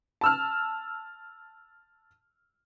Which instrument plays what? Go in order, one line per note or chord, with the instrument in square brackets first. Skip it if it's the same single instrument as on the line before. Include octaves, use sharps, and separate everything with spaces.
[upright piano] A5 E6 F6